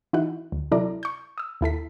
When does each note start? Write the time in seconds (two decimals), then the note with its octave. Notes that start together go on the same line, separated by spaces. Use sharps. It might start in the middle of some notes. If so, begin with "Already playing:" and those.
0.13 E3 D#4 E4 F#4 F#5
0.52 D2
0.72 C3 F#3 E4 A4 D5 A#5
1.03 C#6 G6
1.38 D#6 E6
1.61 D#2 E4 A4 B6